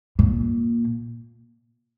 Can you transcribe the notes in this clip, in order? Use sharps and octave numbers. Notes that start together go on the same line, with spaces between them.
A#2